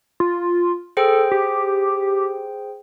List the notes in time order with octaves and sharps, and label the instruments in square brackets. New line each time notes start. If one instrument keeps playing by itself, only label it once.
[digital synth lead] F4
[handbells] G#4 C5 G5 [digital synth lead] A4
[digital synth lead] G4